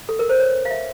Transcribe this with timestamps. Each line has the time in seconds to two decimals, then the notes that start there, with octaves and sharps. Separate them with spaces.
0.09 A4
0.19 A#4
0.29 C5
0.39 C#5
0.65 F5
0.71 E5